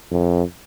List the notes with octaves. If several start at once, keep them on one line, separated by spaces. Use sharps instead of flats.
F2